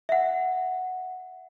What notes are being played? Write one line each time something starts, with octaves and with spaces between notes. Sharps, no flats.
E5 F#5